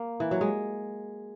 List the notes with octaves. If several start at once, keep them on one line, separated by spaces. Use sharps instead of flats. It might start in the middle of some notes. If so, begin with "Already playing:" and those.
Already playing: A#3
E3
F#3
G#3